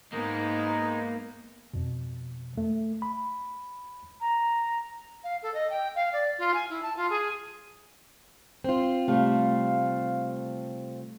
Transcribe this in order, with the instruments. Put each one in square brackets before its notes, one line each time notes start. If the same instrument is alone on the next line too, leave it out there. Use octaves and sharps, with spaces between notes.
[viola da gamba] G#2 B3 [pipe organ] G#3 D#4 [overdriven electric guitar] A#3 A#4
[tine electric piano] F2 B2
A3
B5
[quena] A#5
[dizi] F5
A4
D#5
G5
F5
D5
F4
G#5
E4
A5
F4
G#4
[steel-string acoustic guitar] C4 F4
[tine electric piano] C3 [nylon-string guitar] G3 A3 [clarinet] F5